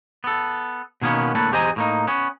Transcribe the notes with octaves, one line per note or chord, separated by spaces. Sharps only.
B3 A4
B2 D#3 A#3 B3 C#4
A2 D3 A#3 A4 B4
E2 G4 C5 D#5 G#5 A#5
A2 A#3 D#4
B3 C#4